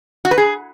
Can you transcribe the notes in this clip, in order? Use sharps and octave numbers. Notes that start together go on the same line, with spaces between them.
F#4
B4
G#4